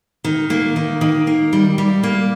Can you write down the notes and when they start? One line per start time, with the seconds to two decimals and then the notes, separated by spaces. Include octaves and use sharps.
0.24 D#3
0.50 A#3
0.76 D#3
1.01 D#3
1.27 A#3
1.53 G3
1.78 G3
2.03 A#3